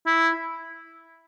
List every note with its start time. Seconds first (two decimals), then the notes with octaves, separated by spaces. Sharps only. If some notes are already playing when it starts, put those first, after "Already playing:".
0.06 E4